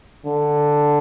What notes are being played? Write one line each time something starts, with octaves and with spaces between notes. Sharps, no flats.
D3